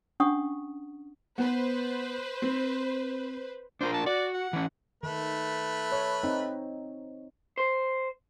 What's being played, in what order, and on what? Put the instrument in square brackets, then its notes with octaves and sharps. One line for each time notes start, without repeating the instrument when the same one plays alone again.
[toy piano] C#4 D4 F#5 C#6 D#6
[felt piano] B3 [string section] B4 C5
[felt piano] C4
[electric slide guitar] D4 F4 A#4 [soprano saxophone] C5
[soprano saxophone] A5
[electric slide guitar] F#4 [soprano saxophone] D5
[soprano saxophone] F#5
[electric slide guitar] E3 C#4
[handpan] D#3 [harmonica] A3 B4
[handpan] C#5
C4 D#4
[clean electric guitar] C5